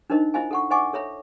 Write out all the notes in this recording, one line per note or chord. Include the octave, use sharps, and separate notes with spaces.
D4 D#4 A#4 C5 D#5
E4 F4 C5 D#5 F5 G#5
A4 F#5 C#6
C5 D#5 F#5 G#5 C#6 D6
A4 C#5 E5 A#5